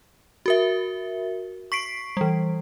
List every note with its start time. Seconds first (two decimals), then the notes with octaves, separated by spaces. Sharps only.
0.46 F#4 A#4 E5
1.72 C#6 B6 C7 D7
2.17 E3 G3